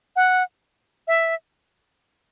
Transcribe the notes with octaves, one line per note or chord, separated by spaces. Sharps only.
F#5
E5